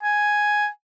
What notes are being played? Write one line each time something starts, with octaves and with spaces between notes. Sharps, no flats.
G#5